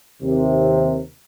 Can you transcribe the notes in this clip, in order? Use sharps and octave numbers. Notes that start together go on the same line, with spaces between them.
D#2 C3